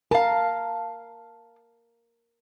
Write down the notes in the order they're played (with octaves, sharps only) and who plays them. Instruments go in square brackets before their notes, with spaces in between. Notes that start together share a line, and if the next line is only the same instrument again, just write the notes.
[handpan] A#4 [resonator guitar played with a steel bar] F5 A5